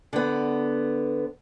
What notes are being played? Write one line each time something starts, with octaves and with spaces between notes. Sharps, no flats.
D3 B3